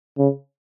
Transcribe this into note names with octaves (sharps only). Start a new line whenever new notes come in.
C#3